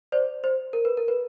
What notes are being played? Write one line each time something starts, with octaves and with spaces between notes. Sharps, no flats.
C5 D5
C5
A#4
B4
A#4
B4